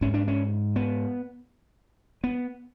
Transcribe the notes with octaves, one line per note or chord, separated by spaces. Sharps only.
G#2 C#4
D4
C#4
B3
B3